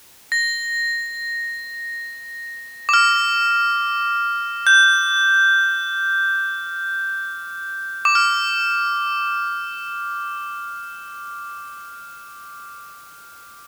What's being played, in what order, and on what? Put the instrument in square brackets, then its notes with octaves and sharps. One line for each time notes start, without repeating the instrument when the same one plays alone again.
[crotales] A#6
D6
F6
G6
D6
F6